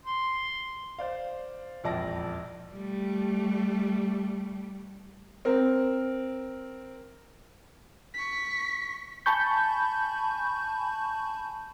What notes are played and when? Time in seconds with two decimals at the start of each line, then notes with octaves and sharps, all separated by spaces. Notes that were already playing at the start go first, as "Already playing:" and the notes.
0.05 C6
0.99 C5 D5 F5
1.84 E1 A#1 F2 D5 A5 A#6
2.72 G3 A3
5.45 C4 A#4
8.14 C#6 B6
9.26 G#5 A5 B5 C#6 G6